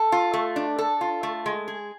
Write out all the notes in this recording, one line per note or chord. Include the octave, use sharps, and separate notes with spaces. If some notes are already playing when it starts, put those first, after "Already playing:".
Already playing: A4
F4
A3
D4
A4
F4
A3
G#3
G#4